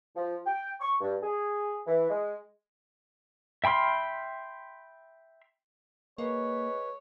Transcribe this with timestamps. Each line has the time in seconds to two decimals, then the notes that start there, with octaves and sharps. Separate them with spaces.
0.16 F3
0.46 G5
0.81 C#6
1.01 G2
1.23 G#4
1.87 E3
2.10 G#3
3.64 E5 G5 B5 C6 F6
6.18 G#3 A#3 B4 C#5